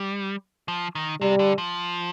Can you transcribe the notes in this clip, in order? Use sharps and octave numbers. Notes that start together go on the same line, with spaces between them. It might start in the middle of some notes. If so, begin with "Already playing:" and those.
Already playing: G3
F3
D#3
C3 G3
D3
F3